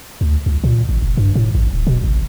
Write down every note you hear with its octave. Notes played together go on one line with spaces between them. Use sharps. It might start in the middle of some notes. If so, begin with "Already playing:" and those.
D2
C#2
A#2
A1
F1
G2
A2
A1
D1
B2
A1